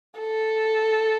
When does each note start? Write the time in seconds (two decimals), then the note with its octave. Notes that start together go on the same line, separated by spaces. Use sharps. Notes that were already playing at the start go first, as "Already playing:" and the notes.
0.20 A4